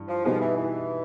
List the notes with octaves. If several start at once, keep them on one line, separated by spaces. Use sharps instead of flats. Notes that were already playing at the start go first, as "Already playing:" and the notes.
Already playing: G2 E3
F3
B2 F3 G3 B3 D#4 G#4
E3
E3